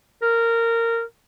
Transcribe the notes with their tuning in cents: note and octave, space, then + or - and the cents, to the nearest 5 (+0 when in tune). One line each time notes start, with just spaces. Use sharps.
A#4 -15